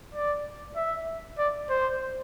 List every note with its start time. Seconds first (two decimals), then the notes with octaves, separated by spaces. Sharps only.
0.15 D5
0.76 E5
1.38 D5
1.70 C5